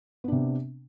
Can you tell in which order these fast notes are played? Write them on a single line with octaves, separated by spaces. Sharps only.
B3 D4 C3